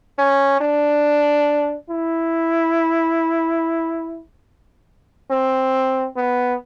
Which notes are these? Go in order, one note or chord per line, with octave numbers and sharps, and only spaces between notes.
C#4
D4
E4
C4
B3